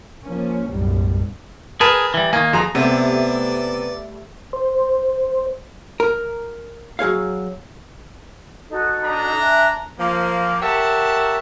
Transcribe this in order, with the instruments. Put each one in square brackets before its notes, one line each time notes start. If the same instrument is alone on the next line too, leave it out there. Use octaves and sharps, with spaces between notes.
[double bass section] F3 A#3 C#4
B1 F#2 A2 G3
[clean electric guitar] G#4 [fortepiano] A#4 B4 A5
[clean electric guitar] E3 G3
[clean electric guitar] D#3 A#3 [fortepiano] G#5
[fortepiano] F2 G#4 A#5
[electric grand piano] C3 [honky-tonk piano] G3 A3 E5 [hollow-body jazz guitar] B3 C4 [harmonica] D5
[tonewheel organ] C5
[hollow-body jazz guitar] A#4
F#3 G#4 C#5 F5
[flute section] D#4 F#4 A4
[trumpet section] D4 A#5
[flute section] E5 G#5 F#6
[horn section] F3 A#3
G4 A#4 C#5 E5 F#5 A5